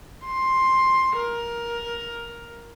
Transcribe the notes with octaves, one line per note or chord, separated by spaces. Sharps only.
C6
A#4